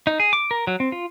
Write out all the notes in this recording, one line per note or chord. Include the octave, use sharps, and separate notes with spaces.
D#4
G#4
D6
A#4
F#3
C4
F4